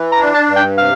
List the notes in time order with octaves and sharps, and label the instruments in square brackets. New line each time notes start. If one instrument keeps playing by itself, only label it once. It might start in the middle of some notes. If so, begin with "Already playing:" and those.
Already playing: [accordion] E3
[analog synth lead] A#5
[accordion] D4
[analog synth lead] A5
[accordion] G2
[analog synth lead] G5
[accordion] C3 [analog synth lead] F5